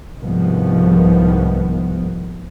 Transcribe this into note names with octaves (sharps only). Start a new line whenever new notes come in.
C2 G#2 D#3 F3 B3